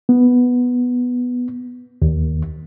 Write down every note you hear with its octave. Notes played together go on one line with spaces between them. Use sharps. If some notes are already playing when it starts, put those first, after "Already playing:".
B3
D#2